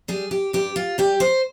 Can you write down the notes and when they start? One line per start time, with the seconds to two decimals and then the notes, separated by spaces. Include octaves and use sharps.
0.08 G3 G#4
0.31 G4
0.53 G2 G4
0.76 F4
0.98 G3 G4
1.20 C5